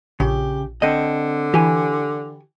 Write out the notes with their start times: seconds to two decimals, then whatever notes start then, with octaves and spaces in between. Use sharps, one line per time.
0.20 A#1 C#3 G4
0.82 D3 C4 D#5
1.54 E3 G4 G#5